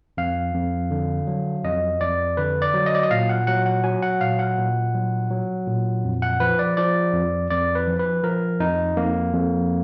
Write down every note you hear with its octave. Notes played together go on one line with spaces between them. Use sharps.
F2 F5
F2
D3
F#3
F2 D#5
F2 D5
D3 B4
D5
F#3
D#5
D5
D#5
A#2 F5
F#5
F#3 F#5
F#5
F#3 G#5
F#5
A#2 F5
F#5
A#2
F#3
F#3
A#2
F2
F#5
F3 B4
D5
F3 D5
F2
F2 D5
B4
F3
B4
F3 A#4
F2 D#4
F2 A#3
F2